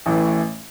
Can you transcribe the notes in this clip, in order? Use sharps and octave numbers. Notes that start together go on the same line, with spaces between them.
A1 A2 E3 A3